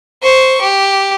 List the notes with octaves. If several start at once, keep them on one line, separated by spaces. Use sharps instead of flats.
C5 C#6
G4